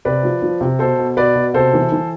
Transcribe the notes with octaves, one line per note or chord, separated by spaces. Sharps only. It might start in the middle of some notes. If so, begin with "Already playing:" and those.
C3 B4 D5
F3
F3
C3
B2 A4 C5
B2
B2 B4 D5
B2
C3 A4 C5
E3
E3